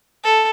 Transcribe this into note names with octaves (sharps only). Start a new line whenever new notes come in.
A4